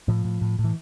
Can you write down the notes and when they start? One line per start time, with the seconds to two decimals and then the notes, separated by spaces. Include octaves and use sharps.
0.08 A2 F3
0.25 A2
0.41 A2
0.59 A2
0.64 E3